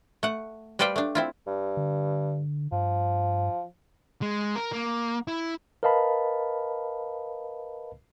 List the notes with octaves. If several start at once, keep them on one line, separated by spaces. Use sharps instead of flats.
A3 F#5
G3 B4 C5 D5 F5 G5
A3 D4
C4 E4 F4
G2
D3
G2 F3
G#3
A#4
A#3
E4
A#4 B4 D#5 F5 A5 B5